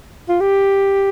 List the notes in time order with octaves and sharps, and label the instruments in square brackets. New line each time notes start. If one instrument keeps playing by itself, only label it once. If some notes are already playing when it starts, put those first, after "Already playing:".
[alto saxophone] F4
G4